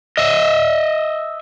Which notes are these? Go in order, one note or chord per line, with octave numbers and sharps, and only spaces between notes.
D#5 E5